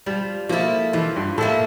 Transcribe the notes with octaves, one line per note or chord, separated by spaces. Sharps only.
F3 G3
F3 A#3 E4 A4
E3 F3
G2
A2 A#3 E4 A4